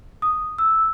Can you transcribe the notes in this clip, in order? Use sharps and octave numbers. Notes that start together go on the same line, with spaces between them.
D#6
E6